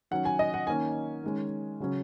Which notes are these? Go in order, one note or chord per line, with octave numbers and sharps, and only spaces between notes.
D#3 F#3 C#4 F#5
G#5
D#5
F#5
D#3 A#3 C#4 G#5
D#3 G#3 C#4
C#3 F#3 C#4